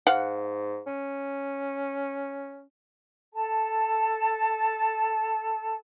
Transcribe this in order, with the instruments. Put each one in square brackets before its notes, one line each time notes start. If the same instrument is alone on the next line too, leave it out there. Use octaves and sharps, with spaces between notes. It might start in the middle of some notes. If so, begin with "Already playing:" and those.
[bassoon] G#2 [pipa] F5 F#5
[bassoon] C#4
[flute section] A4 A5